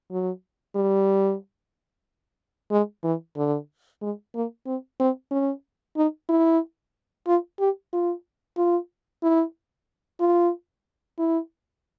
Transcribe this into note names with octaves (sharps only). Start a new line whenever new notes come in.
F#3
G3
G#3
E3
D3
G#3
A#3
C4
C4
C#4
D#4
E4
F4
G4
F4
F4
E4
F4
E4